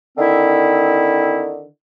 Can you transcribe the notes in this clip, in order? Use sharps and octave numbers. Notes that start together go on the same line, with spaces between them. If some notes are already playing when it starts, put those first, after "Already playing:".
D3 D#3 C4 E4